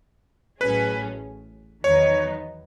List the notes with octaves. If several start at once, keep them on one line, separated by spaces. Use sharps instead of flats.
A1 A2 F#3 C#4 G#4 B4
E2 D#3 F#3 B3 D#4 C#5